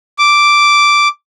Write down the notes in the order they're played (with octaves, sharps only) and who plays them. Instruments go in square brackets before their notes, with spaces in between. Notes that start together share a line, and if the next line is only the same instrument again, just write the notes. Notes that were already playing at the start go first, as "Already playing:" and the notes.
[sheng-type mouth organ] D6